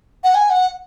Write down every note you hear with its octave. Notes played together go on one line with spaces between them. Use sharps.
F#5
G#5
F#5